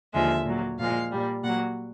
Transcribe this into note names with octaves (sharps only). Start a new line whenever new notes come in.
D#2 D3 F3 G#3 E5
A#2 F#3
A#2 F3 G#3 F5
A#2 G3
A#2 F#3 F#5